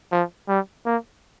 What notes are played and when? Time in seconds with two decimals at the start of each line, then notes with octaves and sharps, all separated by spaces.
0.12 F3
0.49 G3
0.86 A#3